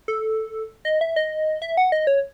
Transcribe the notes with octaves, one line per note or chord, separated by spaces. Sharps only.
A4
D#5
E5
D#5
E5
F#5
D#5
C#5